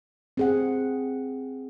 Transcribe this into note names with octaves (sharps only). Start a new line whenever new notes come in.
C4 G#4 F#5